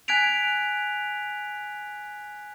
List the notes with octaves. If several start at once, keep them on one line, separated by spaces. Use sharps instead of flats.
G#5 F#6 G#6 B6 D7 F7